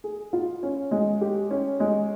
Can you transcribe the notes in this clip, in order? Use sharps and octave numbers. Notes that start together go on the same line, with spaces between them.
G#4
F4
C#4
G#3
G4
C#4
G#3